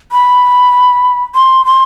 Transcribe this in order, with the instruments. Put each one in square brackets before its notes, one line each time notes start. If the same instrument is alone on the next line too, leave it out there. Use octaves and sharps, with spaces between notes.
[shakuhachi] B5
C6
C6